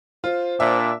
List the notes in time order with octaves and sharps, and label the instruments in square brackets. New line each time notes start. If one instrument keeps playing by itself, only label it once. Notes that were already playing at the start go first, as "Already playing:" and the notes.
[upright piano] F4 [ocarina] C5
[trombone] A#2 [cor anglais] D4 [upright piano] E5